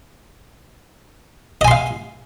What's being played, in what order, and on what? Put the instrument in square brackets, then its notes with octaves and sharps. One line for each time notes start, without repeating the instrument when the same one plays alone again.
[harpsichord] D#5
G#5
C6
F5